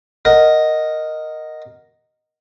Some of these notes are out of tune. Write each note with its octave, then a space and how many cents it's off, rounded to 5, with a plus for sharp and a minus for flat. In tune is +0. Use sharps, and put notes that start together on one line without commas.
A#4 +0 D#5 +0 F#5 +0